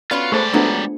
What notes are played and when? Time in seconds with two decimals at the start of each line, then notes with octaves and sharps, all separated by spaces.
0.11 B3 C#4 F4 F#4 D5 B5
0.32 G#3 A3 G#4 C5 D5 A5
0.54 F#3 A3 B3 D4 F4